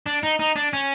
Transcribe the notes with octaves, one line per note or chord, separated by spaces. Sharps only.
D4
D#4
D#4
D4
C#4